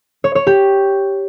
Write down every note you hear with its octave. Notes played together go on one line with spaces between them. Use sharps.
C#5
C#5
G4